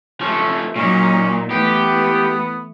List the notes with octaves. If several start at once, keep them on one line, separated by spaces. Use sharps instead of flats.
F3 A3 C#4
A#2 F#3 C#4 D#4
E3 A3 B3 G4